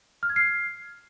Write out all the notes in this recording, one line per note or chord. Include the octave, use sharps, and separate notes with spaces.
F6
G#6
C7